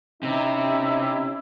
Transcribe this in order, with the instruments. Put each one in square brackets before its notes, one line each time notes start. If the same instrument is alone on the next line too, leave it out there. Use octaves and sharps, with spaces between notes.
[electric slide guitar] C3 [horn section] C#4 D#4 E4